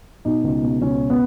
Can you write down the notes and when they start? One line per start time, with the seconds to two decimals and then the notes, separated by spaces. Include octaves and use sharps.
0.25 B2 D#4
0.44 C#2
0.63 B2
0.82 C#2 C#4
1.01 B2
1.10 B3